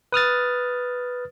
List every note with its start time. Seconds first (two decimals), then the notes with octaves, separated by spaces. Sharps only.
0.12 B4 D#6 F6 A6